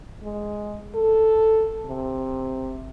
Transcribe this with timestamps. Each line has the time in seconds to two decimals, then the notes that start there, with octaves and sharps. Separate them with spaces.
0.23 G#3
0.95 A4
1.86 C3